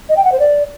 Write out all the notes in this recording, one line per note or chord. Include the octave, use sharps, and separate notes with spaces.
D#5
G5
F#5
C5
D5